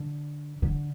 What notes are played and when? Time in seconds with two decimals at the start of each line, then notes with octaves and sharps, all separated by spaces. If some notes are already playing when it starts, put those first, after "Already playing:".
Already playing: D3
0.62 D3